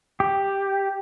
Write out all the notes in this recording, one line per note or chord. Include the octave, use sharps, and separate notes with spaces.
G4